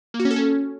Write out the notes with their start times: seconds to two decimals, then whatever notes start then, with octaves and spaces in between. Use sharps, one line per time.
0.14 A#3
0.20 F#4
0.25 C#4
0.31 A4
0.36 C#4